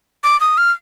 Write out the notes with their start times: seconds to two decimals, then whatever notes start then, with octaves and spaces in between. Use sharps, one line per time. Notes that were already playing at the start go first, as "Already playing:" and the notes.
0.24 D6
0.41 D#6
0.58 F6